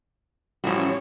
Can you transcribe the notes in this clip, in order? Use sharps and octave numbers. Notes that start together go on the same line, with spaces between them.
A1 A2 F3 G3 C#4 F#4 C#5